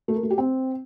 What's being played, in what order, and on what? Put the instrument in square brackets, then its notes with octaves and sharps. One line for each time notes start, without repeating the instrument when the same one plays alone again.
[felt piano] A3
A#4
A3
G4
C4